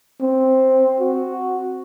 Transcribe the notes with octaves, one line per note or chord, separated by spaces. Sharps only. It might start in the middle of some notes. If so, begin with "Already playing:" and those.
C4
F#4